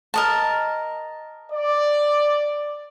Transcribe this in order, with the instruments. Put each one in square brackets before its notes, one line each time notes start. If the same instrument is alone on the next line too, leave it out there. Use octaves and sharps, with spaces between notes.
[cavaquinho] A#4 D#5 A5
[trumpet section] D5